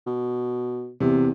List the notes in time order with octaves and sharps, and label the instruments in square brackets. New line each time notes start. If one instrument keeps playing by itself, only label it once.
[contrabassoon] B2
[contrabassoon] E2 [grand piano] C3